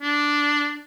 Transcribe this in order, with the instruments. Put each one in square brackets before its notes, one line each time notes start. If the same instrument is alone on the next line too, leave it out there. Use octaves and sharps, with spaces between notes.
[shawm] D4